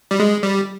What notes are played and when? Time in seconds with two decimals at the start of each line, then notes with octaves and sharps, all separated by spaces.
0.11 G3
0.20 G#3
0.43 G3